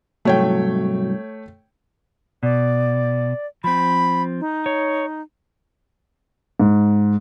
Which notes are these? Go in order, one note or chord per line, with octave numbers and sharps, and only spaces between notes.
C2 G#2 F#3 A3 C#5 G5
B2 D5
F3 C4 B5
D#4
C#5
G#2